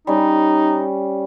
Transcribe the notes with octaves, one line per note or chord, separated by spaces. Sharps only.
G3 C#4 D#4